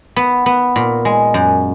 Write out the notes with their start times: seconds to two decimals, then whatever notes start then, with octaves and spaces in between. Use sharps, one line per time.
0.16 B3
0.46 B3
0.76 A#2
1.05 G#3
1.34 F#2